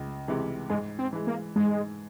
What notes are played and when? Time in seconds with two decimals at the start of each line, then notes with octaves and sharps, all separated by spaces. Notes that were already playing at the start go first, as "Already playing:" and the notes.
Already playing: C#2
0.28 C3 E3 G#3
0.70 G#2 G#3
0.99 C4
1.13 E3 G#3
1.27 A#3
1.56 G#2 G#3